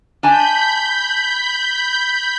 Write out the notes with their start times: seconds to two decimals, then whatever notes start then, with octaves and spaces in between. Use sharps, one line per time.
0.23 D4 G#5 A5 B5 G6